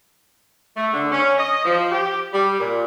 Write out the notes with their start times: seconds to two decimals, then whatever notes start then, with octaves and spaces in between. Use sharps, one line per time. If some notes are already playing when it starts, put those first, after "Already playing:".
0.77 A3
0.94 D3
1.12 C#4
1.38 D#5
1.65 F3
1.91 G4
2.33 G3
2.60 A#2